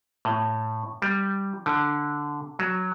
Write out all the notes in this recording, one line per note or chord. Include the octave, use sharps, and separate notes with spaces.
A2
G3
D3
F#3